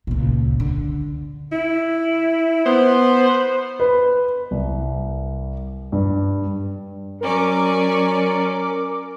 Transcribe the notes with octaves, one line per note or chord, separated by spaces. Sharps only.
C#2 A#2
D3
E4
B3 C5
B4
C2
G2
F#3 C#4 A#4 D5 D6